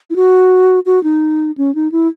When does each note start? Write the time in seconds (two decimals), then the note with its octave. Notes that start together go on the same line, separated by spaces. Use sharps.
0.10 E4
0.16 F#4
0.86 F#4
1.04 D#4
1.58 C#4
1.75 D#4
1.92 E4